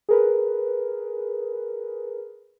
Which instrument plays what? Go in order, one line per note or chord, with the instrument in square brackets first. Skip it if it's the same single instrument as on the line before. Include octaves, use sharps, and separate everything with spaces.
[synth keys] G#4 A#4 B4